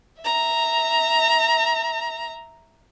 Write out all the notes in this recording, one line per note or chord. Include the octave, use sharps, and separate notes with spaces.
E5 A#5